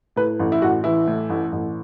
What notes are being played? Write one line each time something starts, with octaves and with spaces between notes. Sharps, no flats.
A2 B4
A1
E4
A1 F#4
E3 E4
A2
A1
A1